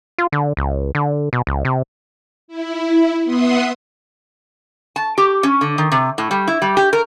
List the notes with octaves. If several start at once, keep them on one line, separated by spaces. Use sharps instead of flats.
F4
D3
C#2
D3
B2
C#2
C3
E4
B3 E5 F#5 C6 D#6
A5
G4
C#4
D3
D#3
C3
A2
G3
E4
G3
G4
A#4